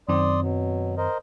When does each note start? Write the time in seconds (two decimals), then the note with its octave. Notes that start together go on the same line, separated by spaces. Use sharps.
0.09 F#2 D#3 C4 D5 C6 D#6
0.42 B2 F#3
0.98 A#4 C5 D#5